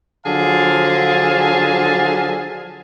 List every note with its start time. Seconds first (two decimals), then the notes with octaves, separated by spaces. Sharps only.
0.25 D3 F3 F#3 G#4 F5 A5